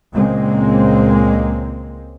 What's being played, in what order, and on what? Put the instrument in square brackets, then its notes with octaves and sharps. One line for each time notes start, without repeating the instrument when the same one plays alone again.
[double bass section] C#2 A#2 G#3 A#3 C4